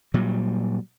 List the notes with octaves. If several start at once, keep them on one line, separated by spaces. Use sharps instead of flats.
A#2 F#3 G3